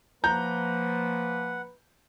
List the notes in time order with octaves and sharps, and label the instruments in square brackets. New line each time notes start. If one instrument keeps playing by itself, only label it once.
[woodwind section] F3 A#3 [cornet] B4 [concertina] F#5 [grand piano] A#5 G6